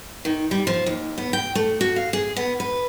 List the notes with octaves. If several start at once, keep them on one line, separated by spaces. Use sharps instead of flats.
D#3
G3
F3
D#2
B3
G5
A3
F#4
F5
G#4
B3
B4